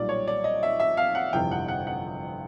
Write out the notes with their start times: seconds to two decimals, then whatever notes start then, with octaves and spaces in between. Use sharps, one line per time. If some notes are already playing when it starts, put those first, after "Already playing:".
Already playing: B1 A#2 G3 D5
0.09 C#5
0.27 D5
0.44 D#5
0.63 E5
0.80 E5
0.97 F5
1.15 F#5
1.33 G1 F2 C3 E3 G5
1.51 F#5
1.68 F#5
1.87 F#5